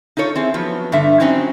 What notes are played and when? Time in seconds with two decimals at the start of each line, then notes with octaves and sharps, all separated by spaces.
0.17 D#4 F4 A4 C#5
0.36 C4 E4 G#4
0.54 F3 F#3 B3
0.92 G2 D3 E5
1.20 F#3 C4 C#4 D#4 E4